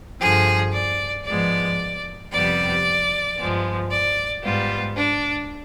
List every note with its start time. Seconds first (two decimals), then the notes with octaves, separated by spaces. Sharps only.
0.20 G2 D3 F3 G#4
0.73 D5
1.25 G#2 F3 G#3 B3 D5
2.31 F2 C3 G3 B3 D5
3.37 G2 F3 G#3 B3
3.91 D5
4.43 G#2 G3 B3 F4
4.96 D4